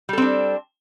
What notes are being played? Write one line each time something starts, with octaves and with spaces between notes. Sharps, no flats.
G3 C4 D4 A4